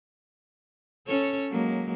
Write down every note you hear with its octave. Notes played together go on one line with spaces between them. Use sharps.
C#4 A4 C#5
F#3 G#3 A#3